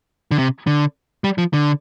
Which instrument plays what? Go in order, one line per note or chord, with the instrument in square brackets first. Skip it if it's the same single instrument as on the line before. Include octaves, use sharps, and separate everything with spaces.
[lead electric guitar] D3
C3
D3
G3
F3
D3